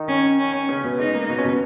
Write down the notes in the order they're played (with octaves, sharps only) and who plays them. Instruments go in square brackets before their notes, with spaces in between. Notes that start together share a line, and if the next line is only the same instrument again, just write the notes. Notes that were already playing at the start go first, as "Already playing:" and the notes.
Already playing: [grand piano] D#3 D#4
[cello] C#4
C#4
[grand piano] C#3 C#4
B2 B3
[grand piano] G#3 [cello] D#4
[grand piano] A#3
B2 B3
C#4
B2 B3